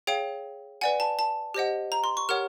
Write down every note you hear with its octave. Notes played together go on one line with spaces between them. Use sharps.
G#4 C#5 F5 G5
B4 D5 F#5 G#5
A5
A5
G4 C5 D#5 F#5
A#5
C6
C#6
G4 A#4 C#5 F#5 F6